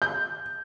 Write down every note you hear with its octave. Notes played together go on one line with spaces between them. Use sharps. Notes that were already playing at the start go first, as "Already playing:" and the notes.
G6